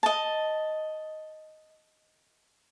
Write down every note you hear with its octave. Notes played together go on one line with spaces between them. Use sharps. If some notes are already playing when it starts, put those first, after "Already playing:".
D#5 A5